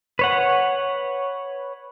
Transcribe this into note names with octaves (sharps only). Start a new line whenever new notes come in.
B4 C#5 F#5